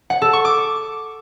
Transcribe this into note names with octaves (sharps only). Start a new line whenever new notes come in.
F#5
A4
C#6
D6